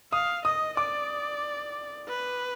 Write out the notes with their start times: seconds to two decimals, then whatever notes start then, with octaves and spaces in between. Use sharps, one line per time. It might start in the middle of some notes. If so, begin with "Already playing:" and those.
0.13 F5 D#6
0.45 D#5 D#6
0.77 D5 D6
2.08 B4